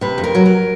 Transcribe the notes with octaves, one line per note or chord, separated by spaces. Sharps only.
C3 B4
F2
A#4
F#3
A#4